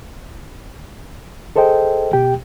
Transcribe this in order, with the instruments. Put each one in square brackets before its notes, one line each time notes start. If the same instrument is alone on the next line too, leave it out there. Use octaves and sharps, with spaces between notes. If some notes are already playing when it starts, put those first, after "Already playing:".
[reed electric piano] G#4 A4 C5 D#5 G5
B2 G4 G5